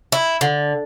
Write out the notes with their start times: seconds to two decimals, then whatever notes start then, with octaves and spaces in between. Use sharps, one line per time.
0.12 E4
0.41 D3